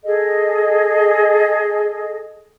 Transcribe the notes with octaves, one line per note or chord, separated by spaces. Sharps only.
G#4 A4 D#5